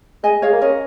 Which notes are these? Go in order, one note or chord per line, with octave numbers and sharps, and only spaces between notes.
G#3 D#5 G#5
G#3 C#5 F5
A#3
C#4 A#4 D#5